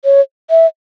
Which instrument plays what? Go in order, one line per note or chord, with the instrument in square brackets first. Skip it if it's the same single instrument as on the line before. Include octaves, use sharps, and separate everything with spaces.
[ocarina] C#5
E5